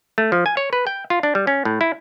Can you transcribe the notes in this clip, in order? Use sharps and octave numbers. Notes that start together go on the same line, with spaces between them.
A3
F3
G#5
C#5
B4
G5
F4
D4
G3
C#4
A2
E4